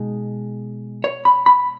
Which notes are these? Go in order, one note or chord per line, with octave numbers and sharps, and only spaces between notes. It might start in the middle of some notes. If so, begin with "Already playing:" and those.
Already playing: B2 G#3 D#4
C#5
B5
B5